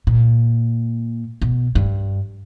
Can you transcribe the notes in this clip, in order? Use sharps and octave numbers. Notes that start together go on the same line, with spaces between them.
A#2
B2
G2